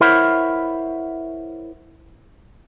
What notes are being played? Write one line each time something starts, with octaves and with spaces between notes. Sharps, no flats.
E4 A#4 C5 C#5 E5 F#5